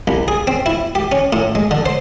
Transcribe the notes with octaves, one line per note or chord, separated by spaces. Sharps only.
C2
G#4
C4
E4
G4
C#4
A2
G#3
D3
C5